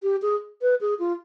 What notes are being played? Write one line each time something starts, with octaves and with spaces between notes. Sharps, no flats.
G4
G#4
B4
G#4
F4